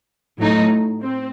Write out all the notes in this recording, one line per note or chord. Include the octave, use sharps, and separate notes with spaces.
A2 F#3 A3 D#4
C4